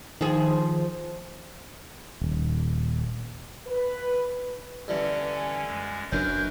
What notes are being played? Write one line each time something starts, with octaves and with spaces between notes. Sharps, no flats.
D#3 F3 G#4
D#1
B4
G2 D3 E3 C#4 D4
G#5
F#2 G#3
F#1 F#2 F#3 C#4 D4 A#4 B4 G6